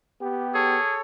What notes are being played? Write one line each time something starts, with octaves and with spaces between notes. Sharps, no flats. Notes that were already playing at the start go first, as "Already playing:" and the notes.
B3 G4
G#4 A4 C#5